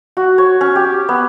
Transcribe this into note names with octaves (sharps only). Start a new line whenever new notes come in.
F#4
C#5
C#4
G4
B3